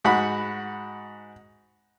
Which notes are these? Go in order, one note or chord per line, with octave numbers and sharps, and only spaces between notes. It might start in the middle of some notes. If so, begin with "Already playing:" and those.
G#2 F#4 B5